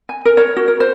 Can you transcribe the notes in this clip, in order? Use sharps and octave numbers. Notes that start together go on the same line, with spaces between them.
G#5
A#4
C#5
F#4
A#4
C5